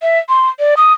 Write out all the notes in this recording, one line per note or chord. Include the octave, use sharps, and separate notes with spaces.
E5
C6
D5
D#6